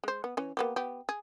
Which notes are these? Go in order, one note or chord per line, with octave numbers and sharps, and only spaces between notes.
G#3 C5
B3
E3 C#4
A#3 B3 G4
B3 G4
G#4